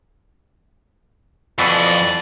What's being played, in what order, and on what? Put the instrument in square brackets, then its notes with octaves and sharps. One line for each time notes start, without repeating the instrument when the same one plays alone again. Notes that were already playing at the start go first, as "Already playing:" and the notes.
[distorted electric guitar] F2 [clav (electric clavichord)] B2 E3 B4 [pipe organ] D5